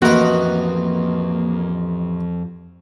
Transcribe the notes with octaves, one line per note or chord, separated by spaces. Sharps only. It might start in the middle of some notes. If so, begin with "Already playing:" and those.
A1 F2 A#3 F#4 A#4 B4 D#5